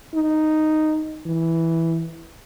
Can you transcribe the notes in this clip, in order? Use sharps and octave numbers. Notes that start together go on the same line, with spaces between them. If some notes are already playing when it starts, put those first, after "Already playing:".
D#4
E3